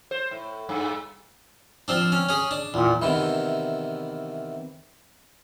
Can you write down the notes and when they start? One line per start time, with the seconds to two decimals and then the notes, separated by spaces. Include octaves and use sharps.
0.11 C5
0.31 A2
0.69 G2
1.88 F3 C4 D4
2.12 C#4
2.29 C#4 G#4
2.51 D4
2.74 E2 A#2
3.02 E2 C3 D#3 E3